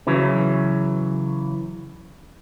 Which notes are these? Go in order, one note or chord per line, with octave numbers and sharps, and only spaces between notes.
C#3 E3 F#3